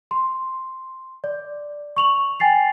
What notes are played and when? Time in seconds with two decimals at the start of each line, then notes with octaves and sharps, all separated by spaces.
0.11 C6
1.24 D5
1.97 C#6 F7 F#7
2.40 G5 G#5 A6 C7 F7